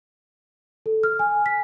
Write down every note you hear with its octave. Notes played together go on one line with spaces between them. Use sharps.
A4
F6
G#5
B6